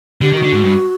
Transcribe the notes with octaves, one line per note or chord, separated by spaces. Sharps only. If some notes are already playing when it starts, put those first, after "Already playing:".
D3 G4
D#3
D3 F#4
G#2
G2